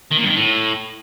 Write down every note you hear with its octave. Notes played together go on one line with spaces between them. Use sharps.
D#3
A#2
G2
D#3
A2